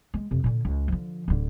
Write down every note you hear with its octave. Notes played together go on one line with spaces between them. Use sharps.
G#3
F2 C3
A#2 D3
C#2
D3 F3
D1 D3